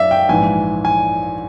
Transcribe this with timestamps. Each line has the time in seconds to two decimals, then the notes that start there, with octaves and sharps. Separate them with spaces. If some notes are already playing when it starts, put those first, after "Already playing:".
Already playing: F#2 D#3 D5 E5 F5
0.11 G5
0.29 A#1 G#2 E3 G#5
0.85 G#5